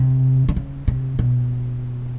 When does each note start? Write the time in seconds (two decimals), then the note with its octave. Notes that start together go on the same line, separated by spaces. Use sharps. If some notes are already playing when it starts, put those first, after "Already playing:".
Already playing: C3
0.49 D3
0.56 C#3
0.88 C3
1.19 B2